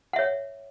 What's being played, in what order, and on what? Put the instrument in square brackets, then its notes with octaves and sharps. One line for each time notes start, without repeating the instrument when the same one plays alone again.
[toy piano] F#5
E5
C#5